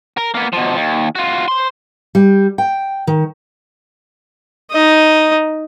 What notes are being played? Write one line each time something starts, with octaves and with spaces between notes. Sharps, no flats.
A#4
A#3 B3
B2 F3
D#2
F4 F#4
C5 C6
G3
G5
D#3
D#4 D#5